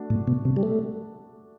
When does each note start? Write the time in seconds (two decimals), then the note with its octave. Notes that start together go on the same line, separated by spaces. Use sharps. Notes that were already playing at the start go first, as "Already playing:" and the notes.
Already playing: A3 D4 F#4
0.10 A2
0.27 B2
0.45 C3
0.56 G3
0.63 A3